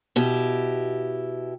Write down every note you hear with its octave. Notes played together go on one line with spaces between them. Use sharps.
B2 E4 G4